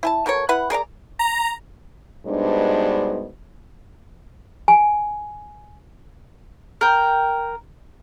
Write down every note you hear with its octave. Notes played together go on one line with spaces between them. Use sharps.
E4 G#5 A5
B2 A4 A#4 C#5
E4 B4 F#5
G#4 A#4 D5 A#5
A#5
G2 B2 G#3 D4 D#4 C5
G#5
A#4 G5